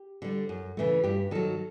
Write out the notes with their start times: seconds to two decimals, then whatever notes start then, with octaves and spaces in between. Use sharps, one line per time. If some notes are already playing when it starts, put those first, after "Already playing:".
Already playing: G4
0.22 D3 G3
0.49 F#2
0.77 C#3 E3 A3
1.04 G2 G4
1.31 D#3 F#3 A4